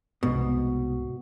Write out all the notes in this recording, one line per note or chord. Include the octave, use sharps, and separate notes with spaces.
C2 G#2 B2